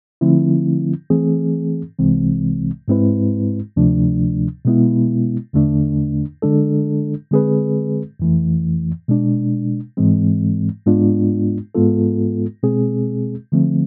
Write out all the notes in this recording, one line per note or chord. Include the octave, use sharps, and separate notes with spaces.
D3 F3 A3 C4 E4
E3 A3 C4 G#4
C2 C3 E3 G#3 C4
G#2 G#3 C4 E4 B4
D2 C3 F3 A3 D4
B2 G#3 B3 E4
E2 D3 A3 D4
D3 G#3 D4 A4
D3 G#3 C4 G#4 B4
F2 E3 A3
B2 G#3 D4
G#2 E3 G#3 C4
G#2 G#3 B3 D4 F4
G#2 G#3 B3 F4 A4
B2 G#3 C4 G#4
D3 F3 A3 C4